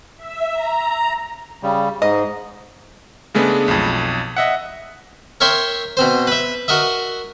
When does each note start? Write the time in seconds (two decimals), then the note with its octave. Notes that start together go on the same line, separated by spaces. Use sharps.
0.17 E5
0.53 A#5
1.63 C#3 G3
2.02 G#2 D#5
3.35 C#3 G#3 A3 B3 D4
3.68 B1 F2
4.37 D#5 E5 F#5
5.41 A#4 C#5 E5 G5 C6
5.97 B2 C4 C5
6.27 B4 E5
6.68 F#4 A#4 D#5 E5